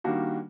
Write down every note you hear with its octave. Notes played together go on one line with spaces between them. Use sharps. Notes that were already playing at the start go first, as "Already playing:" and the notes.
D#3 G3 A#3 D4 F#4